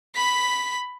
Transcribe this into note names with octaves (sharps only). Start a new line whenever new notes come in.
B5 B6